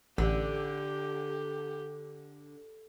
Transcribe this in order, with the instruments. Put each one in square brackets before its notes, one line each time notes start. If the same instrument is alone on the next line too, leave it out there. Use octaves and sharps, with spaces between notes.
[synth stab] A1 [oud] D3 [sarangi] G4